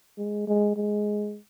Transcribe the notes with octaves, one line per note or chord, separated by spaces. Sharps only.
G#3
G#3
G#3